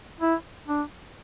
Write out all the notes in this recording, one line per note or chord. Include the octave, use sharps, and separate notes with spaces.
E4
D4